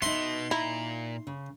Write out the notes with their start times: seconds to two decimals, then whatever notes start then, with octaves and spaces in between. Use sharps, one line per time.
0.02 B2 B3 D#4 E5 C6
0.51 A#2 E4 A#5
1.27 C#3